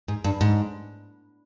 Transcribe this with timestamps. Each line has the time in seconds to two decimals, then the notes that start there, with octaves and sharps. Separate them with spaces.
0.08 G#2
0.24 G2
0.41 G#2